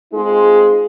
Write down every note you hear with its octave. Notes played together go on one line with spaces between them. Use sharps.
G#3 C4 D#4 F4 G#4